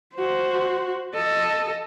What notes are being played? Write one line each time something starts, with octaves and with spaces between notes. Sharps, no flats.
F#4 C5
A4 D#5